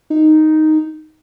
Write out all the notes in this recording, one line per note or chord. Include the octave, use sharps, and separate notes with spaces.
D#4